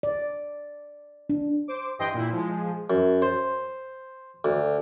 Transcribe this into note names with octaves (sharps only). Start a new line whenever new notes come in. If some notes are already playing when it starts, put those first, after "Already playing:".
D5
D4
C5 D6
G2 E3 D#5 G5 C6
A#2 E4
F3 G#3
F#2
C5
D2